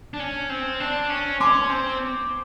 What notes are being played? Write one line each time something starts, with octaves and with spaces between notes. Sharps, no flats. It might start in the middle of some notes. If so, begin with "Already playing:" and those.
D4
C#4
C4
D4
C#4
C#4 C6 D6
C4